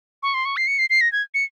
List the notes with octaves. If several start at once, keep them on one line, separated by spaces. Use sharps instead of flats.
C#6
C6
C#6
C7
C#7
C7
C7
A#6
G#6
C#7